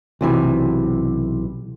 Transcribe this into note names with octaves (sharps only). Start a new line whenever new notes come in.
B1 C3 E3